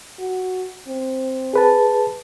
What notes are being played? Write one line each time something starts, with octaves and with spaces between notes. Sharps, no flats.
F#4
C4
G#4 B4 A5